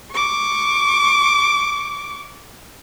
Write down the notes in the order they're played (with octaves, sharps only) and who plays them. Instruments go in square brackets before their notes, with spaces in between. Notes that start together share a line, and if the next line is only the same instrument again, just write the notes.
[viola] C#6 D6